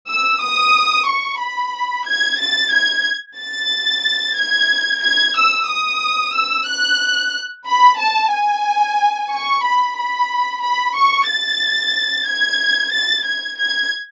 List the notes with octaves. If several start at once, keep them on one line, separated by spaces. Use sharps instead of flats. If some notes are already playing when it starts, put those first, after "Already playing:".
E6
D#6
C#6
B5
G#6
A6
G#6
A6
G#6
G#6
E6
D#6
E6
F#6
B5
A5
G#5
C#6
B5
B5
B5
C#6
A6
G#6
A6
G#6
G#6